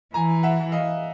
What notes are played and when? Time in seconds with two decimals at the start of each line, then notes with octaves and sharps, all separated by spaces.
0.14 E3 G#5 A#5
0.43 E5 F#5
0.72 D#5 F5